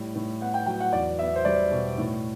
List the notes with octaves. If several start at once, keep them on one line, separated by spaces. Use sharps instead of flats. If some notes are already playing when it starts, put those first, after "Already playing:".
Already playing: A2 G3
A2
B3 F#5
G5
F#3 G5
F#5
E2 D5
B3 E5
C5
G3 D5
B2
A2